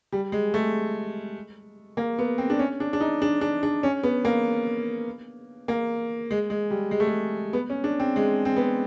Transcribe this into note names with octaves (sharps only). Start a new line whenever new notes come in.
G3
G#3
A3
A#3
B3
C4
D4
C#4
D4
D4
D#4
D4
D4
D4
C#4
B3
A#3
A#3
G#3
G#3
G3
G#3
A3
G#3
B3
C#4
D4
C4
G#3
C4
B3